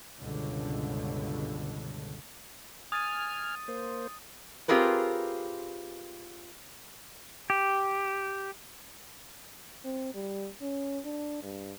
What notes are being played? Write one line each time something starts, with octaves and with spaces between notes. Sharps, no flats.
C#2 G2 B2 D3
G#5 D#6 F6 A6 D#7
A#3 C5
C4 F4 G4 G#4 A#4 B4
G4
C4
G3
C#4
D4
G2